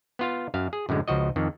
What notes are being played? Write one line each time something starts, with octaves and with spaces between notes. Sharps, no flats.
B3 F4 F5
F#2 F5
G#4
F#2 A2 D3 G#3
C#2 F3 F#4 D#5
F2 D#3